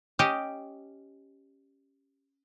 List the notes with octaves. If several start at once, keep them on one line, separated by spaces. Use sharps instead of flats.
C#4 G4 D#5